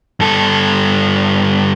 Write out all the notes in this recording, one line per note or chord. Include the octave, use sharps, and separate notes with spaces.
G2 A4